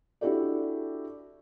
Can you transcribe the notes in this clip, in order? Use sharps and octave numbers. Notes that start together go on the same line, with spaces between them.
D4 E4 F#4 G4 A4 D5